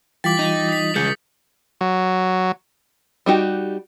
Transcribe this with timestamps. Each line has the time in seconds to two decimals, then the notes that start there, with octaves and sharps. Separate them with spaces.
0.24 E3 G3 F4 G5 D6 A6 B6 F#7
0.39 D#4
0.69 D#6 B6
0.96 C#3 G#3 G#4 G6 C#7
1.81 F#3
3.26 G3 D#4 F#4 G4